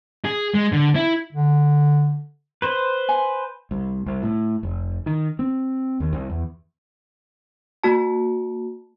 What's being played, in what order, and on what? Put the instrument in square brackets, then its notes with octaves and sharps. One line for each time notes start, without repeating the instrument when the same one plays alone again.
[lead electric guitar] G#4
G#3
D3
E4
[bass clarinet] D3
[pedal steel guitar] B4 C5
[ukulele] G#5
[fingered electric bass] C2
C2
A2
F1
D#3
C4
D#2
C2
E2
[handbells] A#3 F#4 A5